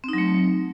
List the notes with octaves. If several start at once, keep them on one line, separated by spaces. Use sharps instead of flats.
F#3 A3 C4 D#4